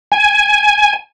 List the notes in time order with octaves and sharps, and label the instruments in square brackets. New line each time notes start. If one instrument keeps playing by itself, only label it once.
[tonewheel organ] G#5